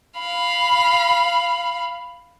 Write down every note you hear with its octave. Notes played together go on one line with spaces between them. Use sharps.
F5 B5